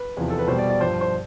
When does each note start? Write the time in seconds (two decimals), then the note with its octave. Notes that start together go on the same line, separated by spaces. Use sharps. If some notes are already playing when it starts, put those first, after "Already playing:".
Already playing: B4
0.17 E2 C3 F3
0.30 A4
0.39 B4
0.48 B2 C5
0.51 G3
0.59 D5
0.70 D5
0.80 G2 F3 C5
1.01 C5